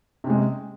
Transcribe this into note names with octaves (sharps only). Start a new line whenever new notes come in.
C3 G#3 C#4